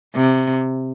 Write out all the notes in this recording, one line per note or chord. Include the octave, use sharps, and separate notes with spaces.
C3